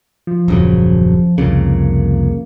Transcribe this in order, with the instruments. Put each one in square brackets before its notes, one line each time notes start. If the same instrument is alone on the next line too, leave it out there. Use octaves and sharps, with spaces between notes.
[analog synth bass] F3
[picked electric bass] D#1 F#2 C#3
[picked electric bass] C2 F2 C#3 [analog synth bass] A#3